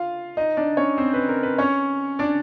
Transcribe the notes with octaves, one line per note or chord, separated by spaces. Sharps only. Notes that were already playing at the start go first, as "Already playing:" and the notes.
Already playing: F4 F5
D#4 D#5
D4 D5
C#4 C#5
C4 C5
B4
A#4
B4
C#4 C#5
D4 D5